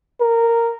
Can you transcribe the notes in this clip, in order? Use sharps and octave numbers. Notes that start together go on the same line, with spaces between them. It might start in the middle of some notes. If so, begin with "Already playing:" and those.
A#4